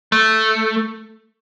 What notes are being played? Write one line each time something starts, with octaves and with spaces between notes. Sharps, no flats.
A3